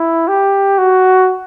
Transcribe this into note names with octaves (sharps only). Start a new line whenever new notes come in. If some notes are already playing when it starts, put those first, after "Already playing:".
Already playing: E4
G4
F#4